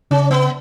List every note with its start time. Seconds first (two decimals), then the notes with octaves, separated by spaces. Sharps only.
0.11 C#3 C#4
0.31 B3